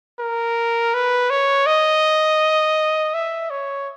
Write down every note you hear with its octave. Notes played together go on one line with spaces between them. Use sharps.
A#4
B4
C#5
D#5
E5
C#5